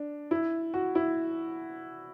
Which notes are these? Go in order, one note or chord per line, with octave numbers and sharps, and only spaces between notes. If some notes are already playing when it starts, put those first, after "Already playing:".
Already playing: D4
E4
F#4
E4